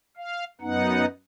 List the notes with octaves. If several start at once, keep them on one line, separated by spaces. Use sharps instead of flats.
F5
F#2 B3 D#4 F#5